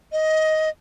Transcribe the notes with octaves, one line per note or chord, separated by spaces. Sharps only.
D#5